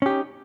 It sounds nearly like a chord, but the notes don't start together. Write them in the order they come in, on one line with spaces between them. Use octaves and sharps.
C#4 G4 D#4